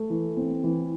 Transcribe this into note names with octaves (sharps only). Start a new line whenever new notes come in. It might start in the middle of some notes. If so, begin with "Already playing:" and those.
Already playing: A3
E3
C4
E3